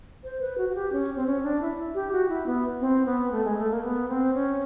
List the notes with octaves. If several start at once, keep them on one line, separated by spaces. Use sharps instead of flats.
C5
B4
F#4
F#4
G4
C#4
C4
C#4
D4
E4
G4
F#4
E4
B3
C4
B3
A3
G#3
A3
A#3
B3
C4
C#4